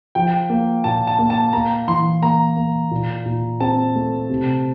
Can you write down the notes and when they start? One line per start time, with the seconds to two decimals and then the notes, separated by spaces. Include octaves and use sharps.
0.15 F3 G5
0.50 A#3
0.84 A#2 A5
1.07 A5
1.19 A#3
1.30 A5
1.53 A#3 A#5
1.87 E3 C6
2.22 A#3 A#5
2.56 A#3
2.91 A#2
3.26 A#2
3.60 C4 A5
3.96 A3
4.30 C3